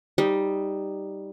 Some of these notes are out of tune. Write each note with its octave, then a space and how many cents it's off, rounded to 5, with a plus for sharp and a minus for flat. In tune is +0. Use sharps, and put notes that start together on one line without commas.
G3 +0 D#4 +0